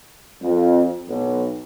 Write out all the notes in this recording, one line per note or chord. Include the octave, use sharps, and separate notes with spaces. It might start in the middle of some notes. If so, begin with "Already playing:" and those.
F2
B1